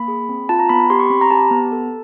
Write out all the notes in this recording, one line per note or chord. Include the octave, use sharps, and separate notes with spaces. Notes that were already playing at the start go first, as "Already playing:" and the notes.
Already playing: A#3 B5
G#4
C4
F4 A5
A#5
B3 B5
B5
G4 C6
C#6
C4 B5
A#5
G4 A5
B3
A4